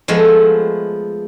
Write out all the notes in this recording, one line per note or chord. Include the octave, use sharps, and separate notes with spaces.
F3 G#3 A3 B3